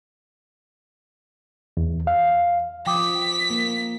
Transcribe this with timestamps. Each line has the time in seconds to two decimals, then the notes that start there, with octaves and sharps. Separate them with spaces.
1.77 E2
2.07 F5
2.87 F3 G5 D6 D#6 B6
3.50 A#3